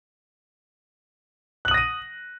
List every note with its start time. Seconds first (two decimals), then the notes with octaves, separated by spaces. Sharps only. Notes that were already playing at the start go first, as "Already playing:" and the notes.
1.65 F#6
1.68 F#7
1.71 D#6
1.74 A#6
1.77 D#7